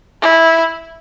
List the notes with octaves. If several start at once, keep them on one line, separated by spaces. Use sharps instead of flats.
E4